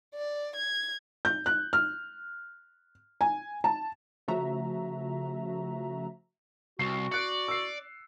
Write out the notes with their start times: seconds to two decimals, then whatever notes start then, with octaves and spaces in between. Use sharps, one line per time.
0.15 D5
0.56 G#6
1.25 G6
1.46 F#6
1.73 F6
3.21 G#5
3.64 A5
4.28 C#3 F3 A3 F#4 E5 A#5
6.79 C2 F#4 C7
7.12 D5 F#6 C#7
7.48 E6 C7